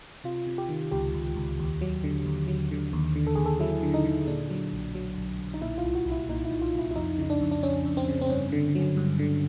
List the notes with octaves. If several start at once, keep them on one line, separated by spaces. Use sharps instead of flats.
C3 F4
C3
G4
D#3
C#2 G4
C#2
C#2
D#2
F#3
D3
D#2
F#3
D3
D#2
D3
A4
D#2 G#4
A4
F#3 E4
D3
D#4
D3
A#2 D4
F#3
B1
F#3
B1
B1
D#4
A#2 E4
F4
C2
F#4
C2
E4
A#2 D#4
E4
A#2
F4
C2 E4
E4
F2 D#4
C#3 D#4
D4
F2
D4
F2 C#4
F2
C4
C#3
C4
G2 C#4
D3
F#3
G2
D3